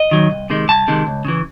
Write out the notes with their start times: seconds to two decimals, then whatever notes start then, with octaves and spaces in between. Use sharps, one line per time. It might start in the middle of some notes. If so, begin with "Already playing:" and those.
Already playing: D#5
0.11 D#3 F#3
0.31 C2
0.50 C3 D#3 G#3
0.68 C2 A5
0.88 C3 D#3 G#3
1.07 C#2
1.25 C#3 E3